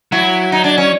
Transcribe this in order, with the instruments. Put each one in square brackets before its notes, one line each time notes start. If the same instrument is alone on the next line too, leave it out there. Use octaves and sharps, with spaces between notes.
[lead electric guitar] F#3 [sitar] E4
[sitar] D#4
D4
C#4